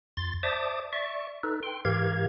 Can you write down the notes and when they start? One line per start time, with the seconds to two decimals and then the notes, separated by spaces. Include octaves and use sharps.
0.17 F2 C6 A6
0.43 C5 D5 E5 A5 D6 D#6
0.93 D5 E5 C#6
1.43 D#4 A4 B4
1.63 G5 C6
1.85 G#2 E3 G4 A#4 F5 G#6